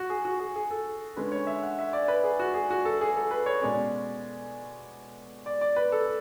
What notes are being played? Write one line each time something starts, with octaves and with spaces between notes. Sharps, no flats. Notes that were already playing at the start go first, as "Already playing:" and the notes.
Already playing: F#4
G#4
F#4
G#4
G#4
A4
D3 G#3 C#4 B4
C#5
E5
F#5
E5
D5
B4
G#4
F#4
G#4
F#4
A4
G#4
A4
B4
C#5
B2 G#3 C#4 D5
D5
D5
B4
A4